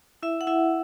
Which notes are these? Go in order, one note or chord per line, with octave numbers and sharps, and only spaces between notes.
E4 E5
F#5
E4 E5